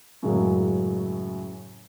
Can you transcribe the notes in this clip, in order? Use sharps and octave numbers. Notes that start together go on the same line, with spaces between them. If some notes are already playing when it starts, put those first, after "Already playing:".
F#2 A2 C#3 F#3 G#3